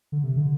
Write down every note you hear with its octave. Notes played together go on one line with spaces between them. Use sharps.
D3
C3
D3